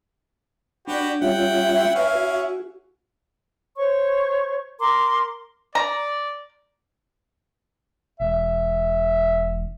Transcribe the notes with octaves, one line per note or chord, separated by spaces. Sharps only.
D4 F#4 G4 B4
G3 C#4 E4 F4 E5 F#5 G5
C#4 E4 B4 F5
F#4
C5 C#5 C#6
A#4 A#5 C6 D6
D5 A#5
E1 E5